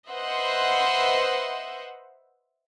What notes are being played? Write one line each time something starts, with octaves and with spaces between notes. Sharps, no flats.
B4 C5 D#5 E5 F#5 C6